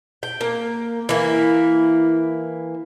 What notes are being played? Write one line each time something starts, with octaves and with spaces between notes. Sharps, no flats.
G5
A#3
E3 A#3 E4